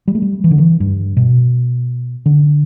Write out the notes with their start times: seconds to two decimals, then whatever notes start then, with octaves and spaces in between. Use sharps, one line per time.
0.08 G3
0.15 A3
0.22 G3
0.44 E3
0.51 D3
0.58 E3
0.80 G2
1.17 B2
2.26 D3